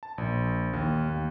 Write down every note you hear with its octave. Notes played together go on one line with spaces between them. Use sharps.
A5
A#1
D#2
D#2